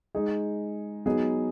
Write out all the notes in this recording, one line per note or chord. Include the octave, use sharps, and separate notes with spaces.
G#3 D#4 G#4
F#3 B3 D#4 G#4